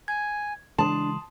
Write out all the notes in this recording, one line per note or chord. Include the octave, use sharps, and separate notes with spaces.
G#5 G#6
C#3 E3 G#3 D4 A5 C6 D#6